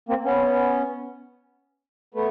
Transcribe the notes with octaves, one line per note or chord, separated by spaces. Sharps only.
A#3 C4
B3 C#4
A3 B3